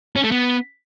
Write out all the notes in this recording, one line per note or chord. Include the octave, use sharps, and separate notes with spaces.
C#4
A3
B3